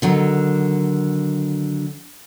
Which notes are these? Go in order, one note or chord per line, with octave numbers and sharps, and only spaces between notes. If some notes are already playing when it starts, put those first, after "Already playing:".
D3 D#3 F#3